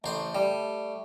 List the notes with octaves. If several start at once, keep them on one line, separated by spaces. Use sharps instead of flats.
A1 A3 C5
G3